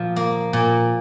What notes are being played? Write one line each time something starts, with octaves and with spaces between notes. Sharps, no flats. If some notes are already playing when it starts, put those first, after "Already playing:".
Already playing: A#2 F3
A#3
A#2